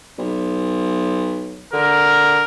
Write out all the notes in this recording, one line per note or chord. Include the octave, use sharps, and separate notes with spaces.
B1
D3 A#4